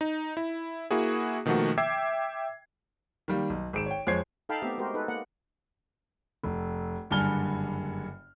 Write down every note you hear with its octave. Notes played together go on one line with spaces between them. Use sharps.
D#4
E4
A#3 E4 F#4 G#4
B2 D#3 F3 A3 A#3 F#4
E5 G5 D6 E6 G#6 C7
D#3 G3 A#3
B1
G#1 G#4 D7 E7
C#5 G5
F2 G#3 C5 C#5 G#6 C7
D#4 A4 F5 G5 A5 B5
A3 B3 C4 G4 E5
G#3 F#4 G4 A#4 C5
D#4 A4 B4
A#3 F#5
F1
F#1 G2 D3 G#5 F6 G7